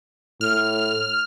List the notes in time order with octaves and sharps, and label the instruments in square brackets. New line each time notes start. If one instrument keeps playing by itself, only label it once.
[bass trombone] A2 [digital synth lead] F6